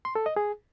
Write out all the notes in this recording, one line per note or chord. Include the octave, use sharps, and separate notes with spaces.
C6
A4
D#5
G#4